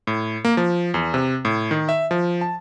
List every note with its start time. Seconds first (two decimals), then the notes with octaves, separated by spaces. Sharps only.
0.07 A2
0.45 A#3
0.57 F3
0.94 E2
1.14 C3
1.45 A2
1.71 D#3
1.89 E5
2.11 F3
2.41 A5